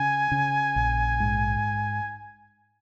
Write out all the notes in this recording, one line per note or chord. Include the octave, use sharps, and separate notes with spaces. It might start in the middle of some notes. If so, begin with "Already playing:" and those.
Already playing: C#3 G#5
C#3
A#1
G#2